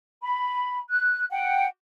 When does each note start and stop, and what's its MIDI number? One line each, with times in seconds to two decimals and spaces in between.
0.22 0.78 83
0.89 1.23 90
1.31 1.65 78
1.31 1.65 79